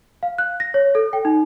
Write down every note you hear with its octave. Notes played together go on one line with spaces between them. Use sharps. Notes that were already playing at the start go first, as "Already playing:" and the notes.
F5
F#6
A#6
C#5
A4
G5
D#4